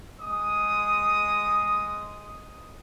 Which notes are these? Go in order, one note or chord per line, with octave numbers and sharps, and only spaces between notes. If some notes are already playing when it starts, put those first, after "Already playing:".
G#3 D#6